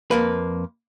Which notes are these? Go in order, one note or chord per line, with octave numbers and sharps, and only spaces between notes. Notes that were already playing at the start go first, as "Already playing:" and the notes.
F2 A#3 B4